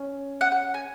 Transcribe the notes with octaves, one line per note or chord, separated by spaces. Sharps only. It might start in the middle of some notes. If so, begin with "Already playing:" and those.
Already playing: C#4
F#5
F#5
G#5